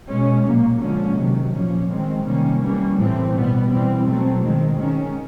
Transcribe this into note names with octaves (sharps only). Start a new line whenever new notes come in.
B2 G#3 C#4
A#2 F#3 A#3
D3 F3 G#3 C#4
C3 D#3 F#3
A#2 F3 A#3 C#4
D#3 G#3 C4
C3 D#3 G3 A#3 C#4
E3 G3 A#3 C#4
A2 E3 A3 C4
B2 G3 B3
E3 G3 C4
B2 F#3 A3 C4
D#3 G#3 C4
D#3 G#3 C#4